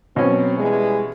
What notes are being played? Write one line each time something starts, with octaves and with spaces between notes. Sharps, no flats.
B2 F#3 C4 C#4
E3 G3 G#3